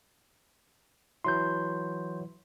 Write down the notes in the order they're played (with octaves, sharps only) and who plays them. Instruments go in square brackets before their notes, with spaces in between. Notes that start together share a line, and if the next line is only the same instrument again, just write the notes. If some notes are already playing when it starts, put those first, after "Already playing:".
[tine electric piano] E3 F#3 E4 [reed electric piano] C6 G6